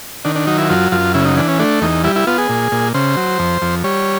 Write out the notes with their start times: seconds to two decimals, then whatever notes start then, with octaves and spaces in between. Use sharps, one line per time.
0.25 D#3 D4
0.36 D4
0.47 F#3 D#4
0.58 E4
0.69 F#2 F4
0.92 F#2 F4
1.14 C#3 E4
1.25 D#4
1.37 E3 D4
1.48 C#4
1.59 A3 D4
1.82 E2 D#4
2.04 G3 E4
2.16 E4
2.27 B3 F4
2.38 G#4
2.49 A#2
2.72 A#2
2.94 C#3 C5
3.17 F#3
3.39 F2
3.62 F2
3.84 G3 C#5